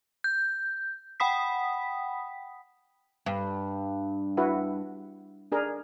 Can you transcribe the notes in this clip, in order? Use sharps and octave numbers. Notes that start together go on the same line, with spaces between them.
G6
F#5 G5 B5 D#6 B6
G2
E4 F#4 B4
D4 G#4 A#4